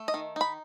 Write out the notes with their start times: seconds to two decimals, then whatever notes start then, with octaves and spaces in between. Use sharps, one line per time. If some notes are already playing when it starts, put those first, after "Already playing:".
Already playing: A3
0.08 D#5
0.14 D#3
0.36 D#4 B5